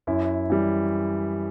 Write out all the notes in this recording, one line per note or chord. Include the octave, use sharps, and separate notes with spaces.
F#2 E4
E3 G3